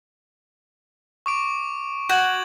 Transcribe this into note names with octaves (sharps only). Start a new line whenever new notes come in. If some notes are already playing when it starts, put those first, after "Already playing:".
C#6 D6 D7
F#4 G6 G#6 F#7